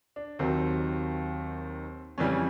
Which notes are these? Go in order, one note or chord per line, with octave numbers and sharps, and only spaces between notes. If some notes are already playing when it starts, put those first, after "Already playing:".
D4
D#2 D#3 F#3 C4
F2 C#3 E3 G3 C#4